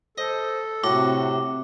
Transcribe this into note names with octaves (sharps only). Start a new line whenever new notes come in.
A4 C5 D#5
A2 C3 F#4 D6